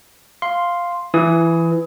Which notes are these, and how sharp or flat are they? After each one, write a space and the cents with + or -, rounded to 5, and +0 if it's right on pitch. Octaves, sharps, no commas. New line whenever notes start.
F5 +0 C6 +0
E3 +15 D#6 +25